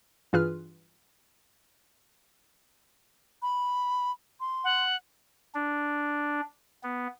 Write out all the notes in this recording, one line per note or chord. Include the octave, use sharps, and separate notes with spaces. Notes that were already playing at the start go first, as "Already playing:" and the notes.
G2 E3 F4 G#4 B4 F6
B5
C6
F#5
D4
B3